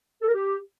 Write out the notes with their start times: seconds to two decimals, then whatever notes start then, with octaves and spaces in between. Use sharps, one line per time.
0.22 A4
0.28 A#4
0.34 G4